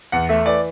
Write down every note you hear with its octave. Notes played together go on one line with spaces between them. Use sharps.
E2 F#5
A3 E5
E3 D5